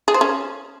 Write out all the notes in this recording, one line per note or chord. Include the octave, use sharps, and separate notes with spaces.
G#4
C5
C#4